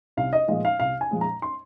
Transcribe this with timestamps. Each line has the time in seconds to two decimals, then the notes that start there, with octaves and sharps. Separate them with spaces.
0.17 C2 F5
0.33 D#5
0.48 A#2 F3 G#3 D#5
0.65 F5
0.80 C2 F5
1.01 G#5
1.11 A#2 F3 G#3
1.21 A#5
1.42 C6